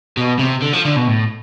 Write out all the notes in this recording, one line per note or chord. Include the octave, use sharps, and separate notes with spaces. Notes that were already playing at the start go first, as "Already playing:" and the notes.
B2
C3
D3
F3
D3
B2
A2